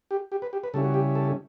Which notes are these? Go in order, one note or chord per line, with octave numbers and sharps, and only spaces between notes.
G4
G4
B4
G4
B4
C#3 G3 C#4 E4 A4
F#4
G4
A4